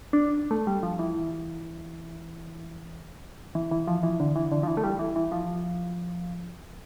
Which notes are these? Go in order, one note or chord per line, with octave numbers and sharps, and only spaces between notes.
D4
A3
G3
F3
E3
E3
E3
F3
E3
D3
E3
D3
F3
E3
A3
G3
E3
E3
F3